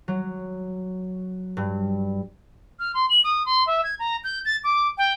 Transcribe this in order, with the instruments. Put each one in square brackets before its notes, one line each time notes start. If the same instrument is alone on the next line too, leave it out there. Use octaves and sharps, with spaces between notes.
[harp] F#3
G2
[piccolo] F6
C6
F#7
D#6
C6
E5
G#6
A#5
G6
A6
D6
G5